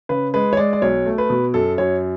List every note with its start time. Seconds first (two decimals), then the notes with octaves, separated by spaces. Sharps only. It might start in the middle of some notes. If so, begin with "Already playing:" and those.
0.09 C#3 B4
0.34 G#3 B4
0.53 C#5
0.57 G#3 D5
0.73 D5
0.82 B1 C#5
1.06 A3
1.18 B4
1.30 B2
1.54 F#2 A4
1.78 F#2 C#5